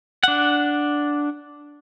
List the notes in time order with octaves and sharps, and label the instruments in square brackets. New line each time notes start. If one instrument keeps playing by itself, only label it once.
[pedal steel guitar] D4 F#5